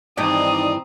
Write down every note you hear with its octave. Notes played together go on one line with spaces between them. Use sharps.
G2 D#3 E3 C4 D#4 D5 A#5 D#6